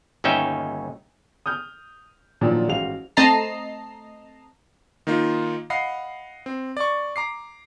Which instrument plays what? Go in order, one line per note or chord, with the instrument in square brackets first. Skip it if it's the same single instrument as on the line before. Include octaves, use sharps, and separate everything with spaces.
[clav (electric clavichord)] G1 D#2 C#4 D#4 E5 G5
[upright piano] D#6 F6 G6
A#2 D#3 F3 F#3 D4
A1 G#2 F#4 F5 F7
[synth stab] A3 C4 D#5 A5 A#5 C7
[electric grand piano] D#3 A#3 D#4 F4
D#5 F5 F#5 B5 C7
C4
D5 C#6
A#5 D6 C7